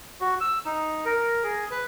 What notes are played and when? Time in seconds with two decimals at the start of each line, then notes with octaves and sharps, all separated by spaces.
0.21 F#4
0.40 E6
0.65 D#4
1.05 A#4
1.43 G#4
1.71 B4